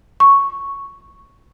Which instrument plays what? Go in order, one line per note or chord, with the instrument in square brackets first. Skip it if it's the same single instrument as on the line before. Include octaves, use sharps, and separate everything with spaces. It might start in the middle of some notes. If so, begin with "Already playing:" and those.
[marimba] C#6